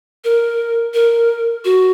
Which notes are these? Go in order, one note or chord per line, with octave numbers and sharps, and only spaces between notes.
A#4
A#4
F#4